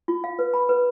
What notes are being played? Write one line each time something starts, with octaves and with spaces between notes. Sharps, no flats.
F4
F5
B4
B5
B4